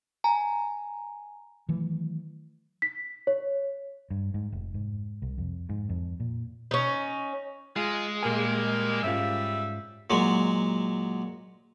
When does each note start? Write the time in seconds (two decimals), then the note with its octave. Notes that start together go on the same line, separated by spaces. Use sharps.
0.24 G#5 A#5
1.69 D#3 E3 F#3 A3
2.82 B6
3.27 C#5
4.10 G2
4.34 G#2
4.52 F1
4.74 G#2
5.22 C2
5.38 F2
5.69 G#2
5.89 F2
6.20 A#2
6.71 C#4 D#4
7.76 G#3 F4 G#4
8.23 A#2 G3 A#3 G#5
9.03 G#2 G3 C#4 F4 E5
10.10 A#2 F#3 G#3 F#4